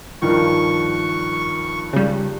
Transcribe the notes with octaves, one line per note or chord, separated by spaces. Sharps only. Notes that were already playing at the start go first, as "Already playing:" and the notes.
G2 D#3 F3 C#6
C#3 G3